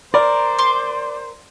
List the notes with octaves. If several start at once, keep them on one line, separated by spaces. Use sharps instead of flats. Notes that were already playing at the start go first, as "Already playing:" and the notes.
A#4 C5 D5
C6 D6